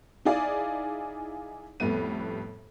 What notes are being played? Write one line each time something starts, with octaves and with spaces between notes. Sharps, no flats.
D#4 E4 G#4 D5 F5
F2 A2 G3 A3 B3 D#7